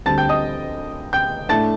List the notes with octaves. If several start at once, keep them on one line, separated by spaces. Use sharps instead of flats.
D2 D3 G3 C4 A5 A6
G5 G6
D#5 D#6
G5 G6
A2 A3 D4 A5 A6